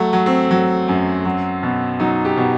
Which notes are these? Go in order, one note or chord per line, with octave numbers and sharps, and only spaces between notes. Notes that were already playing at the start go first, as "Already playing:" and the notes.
Already playing: F#3 A3
F#3
C4
F#3
F#2
F#3
B2
F#3 D#4
G4
B2